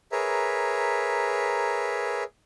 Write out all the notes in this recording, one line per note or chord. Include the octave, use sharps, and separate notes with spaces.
G#4 A#4 B4 C#5 E5 A#5